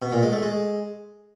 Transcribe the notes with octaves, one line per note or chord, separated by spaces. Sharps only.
B2
A#2
G#3
A3
G#3